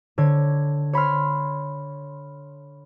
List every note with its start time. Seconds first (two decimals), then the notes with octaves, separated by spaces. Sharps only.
0.18 D3 C#5 G#6
0.93 C#5 B5 C6 F6